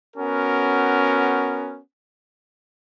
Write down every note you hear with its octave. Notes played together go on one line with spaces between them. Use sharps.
B3 C#4 F#4 A#4